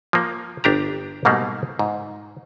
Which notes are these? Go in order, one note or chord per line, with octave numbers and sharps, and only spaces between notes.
F3 A#3
G1 D4 G4 A#5
G#2 B2 G3 A3 A#3
G#2